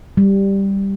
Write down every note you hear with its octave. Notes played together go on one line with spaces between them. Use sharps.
G3